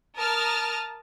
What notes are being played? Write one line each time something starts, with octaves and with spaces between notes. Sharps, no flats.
A#4 A5 D#6 F6